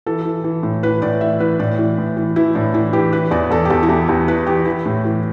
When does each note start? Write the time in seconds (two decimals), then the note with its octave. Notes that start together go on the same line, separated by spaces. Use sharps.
0.06 E3 A4
0.25 E3
0.44 E3
0.63 A2
0.83 E3 B4
1.02 A2 D5
1.21 E3 E5
1.40 E3 B4
1.59 A2 D5
1.78 E3
1.98 A2
2.17 E3
2.36 E3 E4
2.55 A2 D4
2.74 E3 E4
2.93 E3 G4
3.12 E3 B4
3.31 E2 D5
3.50 E2 A4
3.65 G4
3.70 E2 A4
3.83 E4
3.89 E2 G4
4.08 E2 G4
4.28 E3 B4
4.47 E3 G4
4.65 E3 E4
4.86 A2
5.05 E3